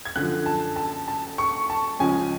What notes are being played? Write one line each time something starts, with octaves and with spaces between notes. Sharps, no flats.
G#6
F#2 D3 F3 F#6
A5
A5
A5
C#6
A5
C#2 C#3 F3 G#3 C#4 G#5